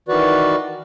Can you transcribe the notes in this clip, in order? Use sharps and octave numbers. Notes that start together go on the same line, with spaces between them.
D#3 E3 F#4 B4 D5